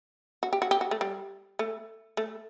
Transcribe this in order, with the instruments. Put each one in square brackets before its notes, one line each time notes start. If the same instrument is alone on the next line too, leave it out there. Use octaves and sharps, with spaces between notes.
[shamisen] F#4
G4
F#4
G4
F#4
A3
G3
A3
A3